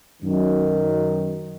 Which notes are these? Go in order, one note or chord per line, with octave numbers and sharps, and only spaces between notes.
F#2 D#3